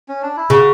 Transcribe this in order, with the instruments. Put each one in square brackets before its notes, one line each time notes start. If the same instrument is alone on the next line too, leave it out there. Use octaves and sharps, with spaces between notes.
[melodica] C#4
D4
E4
[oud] C#3 [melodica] F#4